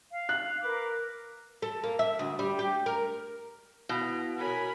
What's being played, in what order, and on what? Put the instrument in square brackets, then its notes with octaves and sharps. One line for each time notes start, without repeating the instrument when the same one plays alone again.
[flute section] F5
[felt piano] F#6
[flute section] A#4 B4 D6
[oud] A4
A#3
E5
D2
G3
G4
A#4
[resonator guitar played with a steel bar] B2 [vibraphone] E4 F5
[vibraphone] F#4 C#5 [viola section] A#4 G#5 B5